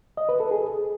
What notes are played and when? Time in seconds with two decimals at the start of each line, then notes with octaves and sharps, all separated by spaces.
0.17 D#5
0.29 B4
0.40 A4
0.51 G#4